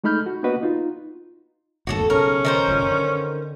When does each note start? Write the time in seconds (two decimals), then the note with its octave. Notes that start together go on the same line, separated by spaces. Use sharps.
0.04 G#3 A3 D#4 B5 F6 G6
0.26 F#4
0.43 A#3 B3 D4 F#4 B4 D#5
0.63 D#4 F4
1.87 D1 G1 D#2 F#4 G#4 A4
2.10 B1 C#3 C#4 A#4
2.45 D#3 A#4 C5
2.68 F#1 A#2
2.91 D3